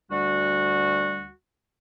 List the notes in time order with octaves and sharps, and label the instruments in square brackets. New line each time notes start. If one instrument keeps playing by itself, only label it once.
[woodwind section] D2 G3 F#4